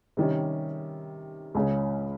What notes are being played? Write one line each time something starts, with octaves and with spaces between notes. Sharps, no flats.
C3 D#3 G3 C#4
C#2 C#3 G#3 C#4